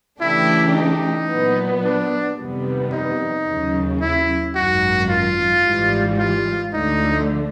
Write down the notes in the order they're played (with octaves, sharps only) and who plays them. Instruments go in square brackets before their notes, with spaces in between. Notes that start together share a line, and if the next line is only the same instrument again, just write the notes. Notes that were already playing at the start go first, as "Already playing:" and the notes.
[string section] C#3 E3 A3 D4 G4 [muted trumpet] E4
[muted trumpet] D#4
[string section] A#2 F#3 B3
[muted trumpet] D4
[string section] F2 C3 D#3 G3 B3
[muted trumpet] D#4
[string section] D#2 C#3 F#3
[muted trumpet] E4
[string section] G#1 F#2 D#3 F#3 [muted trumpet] F#4
[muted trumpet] F4
[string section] G#1 G#2 E3 G3
[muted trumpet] F4
[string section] D2 D3 F3 A3 [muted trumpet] D#4